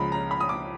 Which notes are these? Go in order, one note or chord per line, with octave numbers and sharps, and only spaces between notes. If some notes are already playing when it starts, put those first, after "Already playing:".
Already playing: C#2 C#3 F3 A#5 B5
A#5
B5
D#6
D6